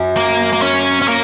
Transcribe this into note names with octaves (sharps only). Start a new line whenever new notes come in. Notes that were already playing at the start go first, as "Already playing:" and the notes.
Already playing: F#2
A#3
A#3
C#4
C#4
A#3